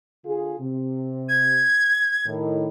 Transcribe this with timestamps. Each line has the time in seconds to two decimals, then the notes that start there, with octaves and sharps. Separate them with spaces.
0.25 D3 F4 G#4
0.59 C3
1.29 G#6
2.26 A2 D#3